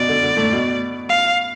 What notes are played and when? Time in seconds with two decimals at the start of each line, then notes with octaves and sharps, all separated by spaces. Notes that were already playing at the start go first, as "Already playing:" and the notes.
Already playing: B2 D5
0.09 D3
0.23 D3
0.37 A2
0.52 B2
1.10 F5